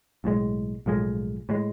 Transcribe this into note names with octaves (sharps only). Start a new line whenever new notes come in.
B1 A2 F3 G#3
B1 A2 F3 G#3
A2 F3 G#3